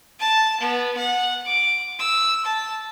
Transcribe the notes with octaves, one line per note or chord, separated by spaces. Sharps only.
A5
B3
F#5
D6
E6
A5